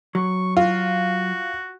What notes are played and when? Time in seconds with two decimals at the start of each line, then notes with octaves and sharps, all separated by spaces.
0.15 F#3 C#6
0.57 F4 F#4